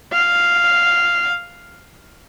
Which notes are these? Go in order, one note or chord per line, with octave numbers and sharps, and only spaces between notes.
F5